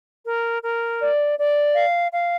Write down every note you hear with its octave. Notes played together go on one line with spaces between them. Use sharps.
A#4
A#4
D5
D5
F5
F5